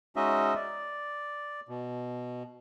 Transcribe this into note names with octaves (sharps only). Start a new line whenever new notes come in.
G#3 C#4 D#4 F#4 D#5 E5
D5
B2